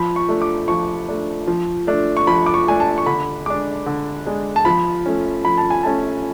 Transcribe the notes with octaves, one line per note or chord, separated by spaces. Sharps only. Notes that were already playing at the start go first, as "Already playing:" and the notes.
Already playing: F3 B5
C#6
A3 D4
D6
F3 C#6
A3 D4
F3
A3 D4
C#6
F3 B5
D6
C#6
A3 D4 G#5
A5
C#6
D3 B5
G#3 D4 D6
D3
G#3 D4
A5
F3 B5
A3 C#4
F3 B5
A5
G#5
A3 C#4 A5